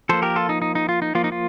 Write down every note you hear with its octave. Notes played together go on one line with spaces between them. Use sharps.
F3 A#3 A4 C5
G4 A#4
F4 A4
D#4
D#4
D#4
F4
D#4
F3 A#3 F4
D#4
F4